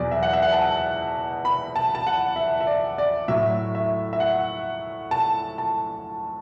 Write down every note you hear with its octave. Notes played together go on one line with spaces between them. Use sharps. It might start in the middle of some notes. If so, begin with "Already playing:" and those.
Already playing: E2 B2 F#3 D5
E5
F#5
E5
F#5
A5
B5
A5
A5
F#5
E5
E5
D5
D5
A2 F#3 E5
E5
E5
F#5
A5
A5